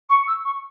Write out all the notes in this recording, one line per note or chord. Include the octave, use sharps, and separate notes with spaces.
C#6
E6
C#6